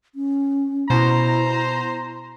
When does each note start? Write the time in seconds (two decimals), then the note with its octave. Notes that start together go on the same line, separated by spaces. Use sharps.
0.15 C#4
0.90 B2 E4 C5 A#5